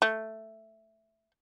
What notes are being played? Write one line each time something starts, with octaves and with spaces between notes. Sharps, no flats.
A3